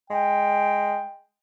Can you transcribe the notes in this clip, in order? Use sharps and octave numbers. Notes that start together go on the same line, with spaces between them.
G#3 G5